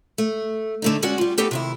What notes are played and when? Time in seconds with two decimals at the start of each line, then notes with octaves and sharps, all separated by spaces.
0.18 A3
0.82 D3 A3 D#4
1.02 G#3 C#4 F#4 D5 F#5
1.18 G3 F4
1.38 A3 B3 D#4 G4 A4
1.51 C3 D#3 E4